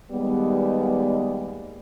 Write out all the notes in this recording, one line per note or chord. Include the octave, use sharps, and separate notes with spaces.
D#2 G3 G#3 B3